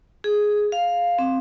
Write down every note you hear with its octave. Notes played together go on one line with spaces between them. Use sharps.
G#4
F5
C4